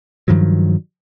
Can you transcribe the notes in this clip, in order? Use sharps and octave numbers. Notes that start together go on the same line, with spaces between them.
G2 D#3 F3 F#3